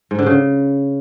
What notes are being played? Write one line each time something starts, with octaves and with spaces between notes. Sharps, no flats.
G#2
D3
C#3